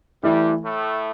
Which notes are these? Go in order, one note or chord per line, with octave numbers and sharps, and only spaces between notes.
G2 E3 G3 A3 E4
A2 A3